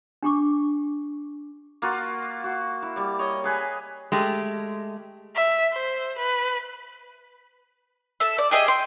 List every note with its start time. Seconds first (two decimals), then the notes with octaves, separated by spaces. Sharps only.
0.23 D4 G4 C#6 D6
1.82 A#3 F4 F#4
2.44 F#4
2.82 E4
2.96 G3 D5
3.19 C#5 D#5
3.44 G#4 B4 G#5
4.12 G#3 A3 G4
5.36 E5
5.74 C5
6.19 B4
8.20 A4 E5
8.38 D5
8.51 G4 G#4 D#5 E5
8.68 G5 C6